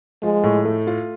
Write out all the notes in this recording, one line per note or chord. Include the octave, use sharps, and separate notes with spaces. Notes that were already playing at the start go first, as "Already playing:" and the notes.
F3 G#3
A2
A3
F4